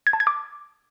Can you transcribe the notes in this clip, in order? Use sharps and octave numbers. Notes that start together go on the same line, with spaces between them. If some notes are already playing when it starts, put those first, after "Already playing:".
G#6
A5
G#6
D6